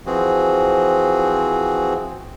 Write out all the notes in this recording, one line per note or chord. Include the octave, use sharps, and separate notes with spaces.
E3 F3 C4 F#4 G#4